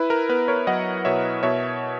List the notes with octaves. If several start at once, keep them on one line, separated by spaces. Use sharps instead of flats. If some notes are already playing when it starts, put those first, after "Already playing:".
Already playing: E4 B4
A#4
B3 B4
A#4 C#5
F#3 D#5 F#5
B2 C#5 E5
B2 C#5 E5